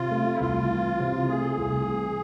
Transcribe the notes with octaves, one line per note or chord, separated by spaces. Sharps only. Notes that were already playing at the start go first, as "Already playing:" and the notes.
Already playing: C3 F4
A3
E4
C2 F4
E3
C3
A3 G#4
C2
E3